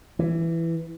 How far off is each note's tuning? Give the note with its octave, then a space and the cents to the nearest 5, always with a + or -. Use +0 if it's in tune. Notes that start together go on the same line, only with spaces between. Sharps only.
E3 +10